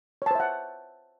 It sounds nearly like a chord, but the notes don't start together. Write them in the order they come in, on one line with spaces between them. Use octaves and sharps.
C#5 A5 C5 E5 F#5